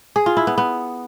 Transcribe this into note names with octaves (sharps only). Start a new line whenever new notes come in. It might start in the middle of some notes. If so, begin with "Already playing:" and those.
G#4
F4
E4
B3
B3